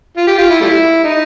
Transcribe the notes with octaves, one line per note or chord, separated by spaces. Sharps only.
F4
G4
F4
E4
G3 A3 E4
D#4